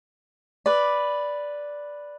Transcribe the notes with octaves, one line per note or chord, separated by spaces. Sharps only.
B4 D5